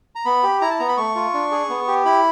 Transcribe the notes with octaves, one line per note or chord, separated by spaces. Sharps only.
A#5
B3 B5
G4
E4 A#5
A5
B3 A#5
B5
A3 C#6
F4
D4
G#4
B3
G4
E4 B5